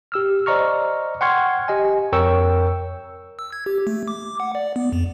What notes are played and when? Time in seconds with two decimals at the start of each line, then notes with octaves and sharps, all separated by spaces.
0.12 G4 E6 F6
0.46 C5 D5 D#5 A#5 C#6 F6
1.21 F#5 G5 C6 C#6 F6 G#6
1.68 G4 D#5 G#5
2.12 F2 A#4 C#5 G5 C#6 E6
3.39 E6
3.52 G#6
3.66 G4
3.87 A3
4.08 D6
4.40 F#5
4.55 D5
4.76 B3
4.93 F2